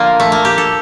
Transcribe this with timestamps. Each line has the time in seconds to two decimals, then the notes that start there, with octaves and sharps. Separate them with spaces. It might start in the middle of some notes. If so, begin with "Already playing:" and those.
Already playing: D3 F3 A#3 F4
0.20 A3
0.32 A#3
0.45 G4
0.58 A4